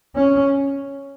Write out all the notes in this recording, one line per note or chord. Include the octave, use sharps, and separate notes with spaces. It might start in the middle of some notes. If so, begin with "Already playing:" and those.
C#4